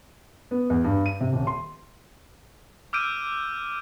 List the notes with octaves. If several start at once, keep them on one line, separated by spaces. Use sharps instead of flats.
B3
E2
G2
D#7
C3
D#1
C6
D6 E6 F6 G6 D7 D#7